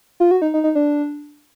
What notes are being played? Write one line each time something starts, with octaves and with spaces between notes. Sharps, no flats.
F4
F#4
D#4
D#4
D#4
D4